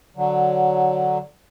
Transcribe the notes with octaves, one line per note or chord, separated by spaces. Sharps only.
D3 F#3